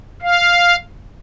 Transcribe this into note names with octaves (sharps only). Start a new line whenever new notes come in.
F5